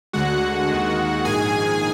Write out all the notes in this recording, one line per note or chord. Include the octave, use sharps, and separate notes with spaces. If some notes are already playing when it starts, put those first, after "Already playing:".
D2 D3 G#3 F#4 F#5
D#2 D#3 G#3
A#1 G#2 D#3 G#4 G#5